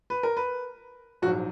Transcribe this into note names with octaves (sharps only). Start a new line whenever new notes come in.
B4
A#4
B4
A#1 G#2 F#3 F#4